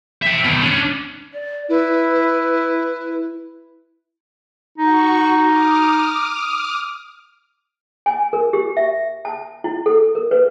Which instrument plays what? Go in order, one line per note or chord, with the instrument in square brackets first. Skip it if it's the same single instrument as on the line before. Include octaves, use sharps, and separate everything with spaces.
[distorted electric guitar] E5 G5
B2 D#3
C#4 D4
[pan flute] D5
[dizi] E4 [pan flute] B4
[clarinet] D#4 [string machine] F#4 C#6
[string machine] D6 D#6 F6
[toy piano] G#5
A#4
G4
E5
A5
E4
A4
A#4
B4